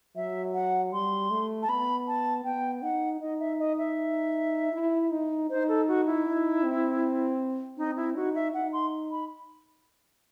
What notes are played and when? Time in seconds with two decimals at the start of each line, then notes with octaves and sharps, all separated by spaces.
0.16 F#3 E5
0.54 F#5
0.93 G3 C6
1.31 A3
1.63 A5
1.69 B3 B5
2.07 A5
2.44 B3 G5
2.82 D#4 F#5
3.21 D#4 D#5
3.40 E5
3.60 D#5
3.78 E5
4.73 E4
5.11 D#4
5.50 D#4 C5
5.68 A4
5.88 F#4
6.07 E4
6.26 D#4
6.64 C4
7.78 C4 D#4
7.97 E4
8.16 D#4 F#4
8.35 E5
8.54 D#4 F#5
8.73 C6
9.11 B5